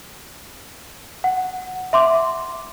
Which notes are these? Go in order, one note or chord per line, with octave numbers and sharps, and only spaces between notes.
F#5
E5 C6 D6